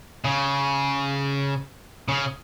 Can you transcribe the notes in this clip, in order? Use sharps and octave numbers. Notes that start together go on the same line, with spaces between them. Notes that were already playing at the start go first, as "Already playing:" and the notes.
C#3
C#3